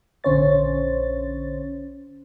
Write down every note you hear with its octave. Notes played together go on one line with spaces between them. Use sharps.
A#1 D3 C#4 C5 C#5 A6